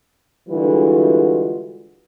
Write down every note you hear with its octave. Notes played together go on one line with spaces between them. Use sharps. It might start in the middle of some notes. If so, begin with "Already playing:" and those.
D3 E3 G3 G#3 F4 F#4